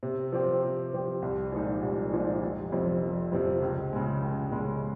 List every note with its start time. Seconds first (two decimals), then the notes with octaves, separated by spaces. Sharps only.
0.03 C3
0.32 F3 C4 G4
0.63 C3
0.93 F3 C4 G4
1.22 C2
1.52 A#2 F3 G#3 D#4
1.83 C2
2.12 A#2 F3 G#3 D#4
2.42 F1
2.72 F2 C3 F3
3.02 F1
3.32 F2 C3 F3
3.62 C#2
3.92 C#3 G#3
4.21 C#2
4.51 C#3 G#3